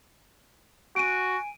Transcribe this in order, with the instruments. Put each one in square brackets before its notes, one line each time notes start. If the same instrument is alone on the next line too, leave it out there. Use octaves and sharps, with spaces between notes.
[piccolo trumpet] F#4 [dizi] G#5 [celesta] D7 D#7